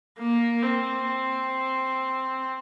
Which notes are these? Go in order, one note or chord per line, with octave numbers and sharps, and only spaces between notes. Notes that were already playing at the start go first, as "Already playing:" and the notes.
A#3
C4